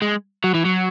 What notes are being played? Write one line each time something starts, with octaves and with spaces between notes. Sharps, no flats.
G#3
F#3
E3
F#3